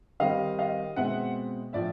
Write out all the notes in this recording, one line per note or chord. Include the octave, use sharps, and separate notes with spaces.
D#3 G3 C4 D#5 F5
D#5 F5
B2 G#3 C4 E5 F#5
A2 F3 D5 E5